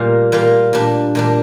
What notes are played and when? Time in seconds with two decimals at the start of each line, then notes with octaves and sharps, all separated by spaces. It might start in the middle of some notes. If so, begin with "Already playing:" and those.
Already playing: A#2 G3 A#3 F4
0.32 A#2 G3 A#3 F4
0.73 A#2 G3 D4
1.15 A#2 G3 D4